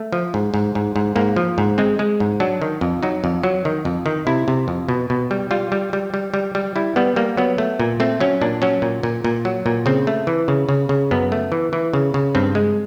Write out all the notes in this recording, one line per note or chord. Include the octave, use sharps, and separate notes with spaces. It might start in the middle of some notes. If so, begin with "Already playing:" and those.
Already playing: A3
F3
G#2
G#2
G#2
G#2
G#2 A#3
F3
G#2
G#3 C4
G#3
G#2
F#3 D4
D#3
F2
F#3 D#4
F2
F#3
D#3
F2
D#3
C3 E4
C3
F2
B2
B2
G3
G3 F4
G3
G3
G3
G3
G3
G3 E4
G3 B3
G3 A#3
F#3 B3
A3
A#2
A3 C4
F#3 C#4
A#2 D4
F#3 C#4
A#2
A#2
A#2
F#3
A#2
C#3 C4
A3
E3
C#3
C#3
C#3
F#2 B3
A3
E3
E3
C#3
C#3
G2 C4
G#3